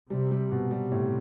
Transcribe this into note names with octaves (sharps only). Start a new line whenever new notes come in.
C3 G3
G3
B2
C3 G3
A2